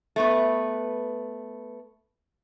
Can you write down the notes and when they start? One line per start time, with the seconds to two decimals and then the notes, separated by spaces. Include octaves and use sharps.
0.16 A3 B3 B4